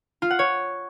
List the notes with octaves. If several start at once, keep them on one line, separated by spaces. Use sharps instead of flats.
F4
F#5
C#5